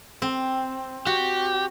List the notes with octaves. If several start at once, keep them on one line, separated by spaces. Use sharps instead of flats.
C4
F#4 G4